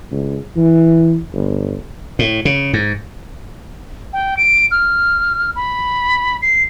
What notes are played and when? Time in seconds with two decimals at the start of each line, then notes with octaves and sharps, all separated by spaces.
0.11 C#2
0.56 E3
1.34 G1
2.19 A2
2.45 C#3
2.73 G#2
4.13 G5
4.37 D7
4.71 F6
5.56 B5
6.42 C7